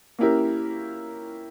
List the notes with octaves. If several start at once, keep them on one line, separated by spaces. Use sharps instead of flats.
A#3 C#4 E4 G4 A#4